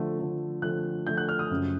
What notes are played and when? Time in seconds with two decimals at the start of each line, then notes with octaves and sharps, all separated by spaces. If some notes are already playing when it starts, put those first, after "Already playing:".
Already playing: D3 F3 A3
0.19 D3 F3 A3
0.62 D3 F3 A3 F#6
1.07 D3 F3 A3 G6
1.17 F#6
1.29 F6
1.39 D#6
1.51 F#2 C#3 F3